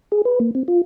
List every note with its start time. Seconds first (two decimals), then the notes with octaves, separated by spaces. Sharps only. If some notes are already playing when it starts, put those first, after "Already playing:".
0.12 G#4
0.25 B4
0.40 A#3
0.55 C4
0.68 F4